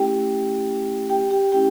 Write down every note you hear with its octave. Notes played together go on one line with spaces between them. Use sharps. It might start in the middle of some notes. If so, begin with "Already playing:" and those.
Already playing: A3 C#4 E4 G4 G5
G4 G5
G4 G5
A3 C#4 E4 G4 G5